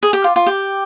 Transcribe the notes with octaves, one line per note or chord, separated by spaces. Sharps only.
G#4
G4
F4
F4
G4